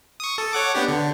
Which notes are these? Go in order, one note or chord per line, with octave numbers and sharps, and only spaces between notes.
C#6 D#6
A4
C#5 F#5 D6
B3 D4 G4
D3